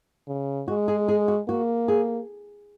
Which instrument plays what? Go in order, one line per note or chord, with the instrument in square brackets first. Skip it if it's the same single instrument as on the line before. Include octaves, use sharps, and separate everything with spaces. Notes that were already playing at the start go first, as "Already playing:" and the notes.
[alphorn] C#3
[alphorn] G#3 [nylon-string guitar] F#4
[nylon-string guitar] G#4
G#4
F#4
[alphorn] A#3 [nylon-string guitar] F#4
[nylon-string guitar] G#4